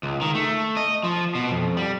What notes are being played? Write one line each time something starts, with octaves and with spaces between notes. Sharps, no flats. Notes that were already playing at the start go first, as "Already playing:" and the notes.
C#2
D#3
A3
D#5
F3
B2
F2
G3